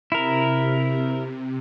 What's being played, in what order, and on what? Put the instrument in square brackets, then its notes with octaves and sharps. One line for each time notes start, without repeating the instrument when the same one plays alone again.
[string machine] C3 [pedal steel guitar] E4 A#4